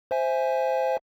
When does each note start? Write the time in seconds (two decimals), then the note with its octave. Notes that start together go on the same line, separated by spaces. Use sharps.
0.11 C5 E5 G#5